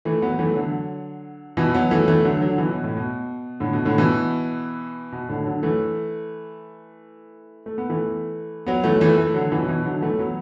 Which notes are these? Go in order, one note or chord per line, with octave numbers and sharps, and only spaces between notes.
E3 A3
F#3 B3
F#3
E3 A3
D3 F#3
B2 E3
F#3 B3
E3 A3
E3 A3
D3 F#3
D3 F#3
B2 E3
B2
A2
B2
A2 D3
B2
A2 D3
B2 E3
B2
A2 D3
D3 F#3
E3 A3
A3
B3
E3 A3
F#3 B3
E3 A3
E3 A3
E3 A3
D3 F#3
B2 E3
B2 E3
D3 F#3
E3 A3
F#3 B3